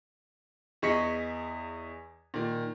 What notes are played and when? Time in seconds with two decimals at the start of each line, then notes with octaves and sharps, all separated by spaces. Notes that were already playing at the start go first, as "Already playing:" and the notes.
0.82 E2 G#4 D#5 C#6 B6 C#7
2.34 A#2 D#3